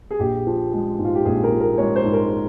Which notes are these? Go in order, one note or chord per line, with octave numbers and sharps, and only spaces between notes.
G#4
A#1 G4
F3
G#3
G#2
F4
G4
A#1 G#4
A#4
F3
A#4
G#3 C#5
C5
G#2
A#4